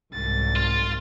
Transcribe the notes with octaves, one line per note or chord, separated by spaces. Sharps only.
C2 G#2 A6
F4